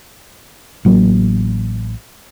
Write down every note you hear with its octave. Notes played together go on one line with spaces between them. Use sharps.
A1 F#3 A#3